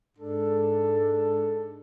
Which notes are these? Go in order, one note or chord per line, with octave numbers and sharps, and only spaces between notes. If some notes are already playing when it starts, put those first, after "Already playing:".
G#2 G#3 D4 A4